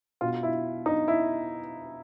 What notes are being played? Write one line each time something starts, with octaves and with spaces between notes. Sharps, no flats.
B2 F4
E4
D#4
E4